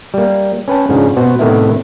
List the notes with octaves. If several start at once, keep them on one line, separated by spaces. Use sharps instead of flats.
G3 A#3
C#4 B4 G5 A5
G#2 C#3 F3 C#4 D4
B2 B3 F#4 C5
A2 C3 D#3 A3 B3 E4